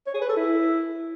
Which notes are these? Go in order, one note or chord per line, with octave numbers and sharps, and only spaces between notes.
C#5
G#4
B4
A4
E4